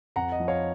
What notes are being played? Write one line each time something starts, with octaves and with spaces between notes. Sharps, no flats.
F2 F#5 A#5
D#5
F3
C#5 F5